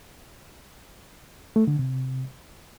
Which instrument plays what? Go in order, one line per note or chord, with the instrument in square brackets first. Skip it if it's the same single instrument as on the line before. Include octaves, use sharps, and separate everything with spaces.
[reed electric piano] A3
D3
C3